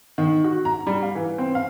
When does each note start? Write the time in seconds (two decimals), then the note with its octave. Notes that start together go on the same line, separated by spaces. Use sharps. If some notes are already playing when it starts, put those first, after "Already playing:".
0.18 D#3
0.44 F#4
0.65 A#5
0.87 G3
1.02 F5
1.15 E3
1.38 C4
1.55 F5